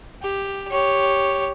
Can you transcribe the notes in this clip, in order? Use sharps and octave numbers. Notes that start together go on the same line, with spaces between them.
G4
G4 C#5